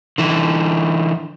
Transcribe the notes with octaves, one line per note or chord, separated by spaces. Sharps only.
D3 E3